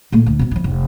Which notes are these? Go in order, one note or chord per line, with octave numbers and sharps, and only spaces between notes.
A#2 A3
D2
B2 C4
F3 E4
F1